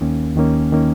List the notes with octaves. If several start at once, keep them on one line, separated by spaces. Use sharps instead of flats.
D#2 D#3 A#3 C#4
D#2 D#3 A#3 C#4
D#3 A#3 C#4